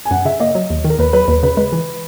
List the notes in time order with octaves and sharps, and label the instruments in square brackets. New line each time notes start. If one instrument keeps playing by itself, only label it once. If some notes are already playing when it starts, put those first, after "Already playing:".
[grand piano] G#5
[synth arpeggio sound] F#2 [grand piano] F#5
[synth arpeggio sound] C#3 [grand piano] E5
[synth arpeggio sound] A#3 [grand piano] D#5
[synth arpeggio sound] F#3
D#2
D#3
[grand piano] A#4
[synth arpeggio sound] D#2 [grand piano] B4
[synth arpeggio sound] F#3 [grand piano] B4
[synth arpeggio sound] D#2 [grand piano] B4
[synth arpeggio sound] C#3 [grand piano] B4
[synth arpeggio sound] G#3 [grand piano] B4
[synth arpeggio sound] E3